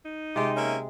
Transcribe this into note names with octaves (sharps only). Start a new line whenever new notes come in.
D#4
C3 G#3 F4 G4
A#3 C#4 E5